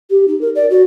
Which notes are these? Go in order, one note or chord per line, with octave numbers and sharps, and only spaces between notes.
G4
D#4
A#4
D5
F#4